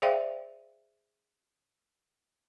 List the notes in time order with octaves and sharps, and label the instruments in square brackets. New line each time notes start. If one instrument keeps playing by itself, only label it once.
[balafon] G#4 C5 D5 E5 F5 G5